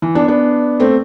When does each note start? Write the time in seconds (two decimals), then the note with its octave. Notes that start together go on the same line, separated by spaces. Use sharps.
0.02 E3
0.15 B3 D4
0.28 B3 D4
0.80 A3 C4